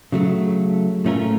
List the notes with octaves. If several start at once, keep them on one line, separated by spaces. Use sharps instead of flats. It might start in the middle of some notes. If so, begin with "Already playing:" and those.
C#3 F#3 A3
A2 A3 C#4 F4 A#4